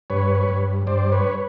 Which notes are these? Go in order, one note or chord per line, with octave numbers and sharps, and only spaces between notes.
G2 B4 C#5
B4 C#5
G2
G2 C5 D5
B4 C#5